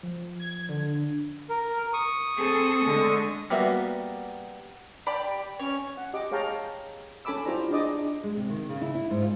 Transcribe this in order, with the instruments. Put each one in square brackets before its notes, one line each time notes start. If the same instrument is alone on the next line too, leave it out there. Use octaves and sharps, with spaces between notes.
[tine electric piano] F3
[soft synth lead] G#6
D3
[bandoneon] A#4
C#6 D#6
[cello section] C4 G#4 A4
D3 G#3 A4
[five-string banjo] G3 A#3 B3 F#4 E5
[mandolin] G4 D5 B5
[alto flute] C#4 [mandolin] C#5
[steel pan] F#5
G4 D#5 D6
G#4 C#5 F5 G5 A5 A#5
C#4 A4 G#5 B5 D6 E6
E4 F4 G4 C5 D5 A#5
D4 G#4 D5 D#5 D6 D#6
[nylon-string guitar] G#3
C3
D#3
C#3
E4
E4
G#2
F4